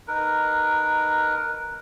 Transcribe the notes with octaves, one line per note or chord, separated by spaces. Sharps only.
D#4 A#4 B4